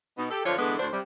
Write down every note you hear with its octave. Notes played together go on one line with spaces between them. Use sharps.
B2 B3 D#4
G4 A4
F#2 D3 F3 D4 F4 C#5
D3 E3 G#3 A3 B3 D4
D2 A2 D4 C5
C3 G3